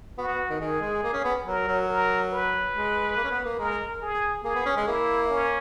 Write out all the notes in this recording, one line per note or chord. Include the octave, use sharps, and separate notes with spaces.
B3 F#4
B3
D#3
D#3 G#4
G#3
A#3
C#4
B3
F#3 A#4
F#3
A#4
B4
G#3
A#3
C#4
B3
A#3
G#3 A#4
G#4
A#3 G#4
B3
C#4
G#3
A#3 E4
C#4